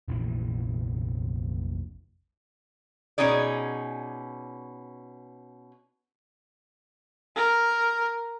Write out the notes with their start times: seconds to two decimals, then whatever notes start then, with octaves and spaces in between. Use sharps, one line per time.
0.08 F1 A#1 A#2 E3
3.18 B2 C#4 D#4 G#4 D5
7.36 A#4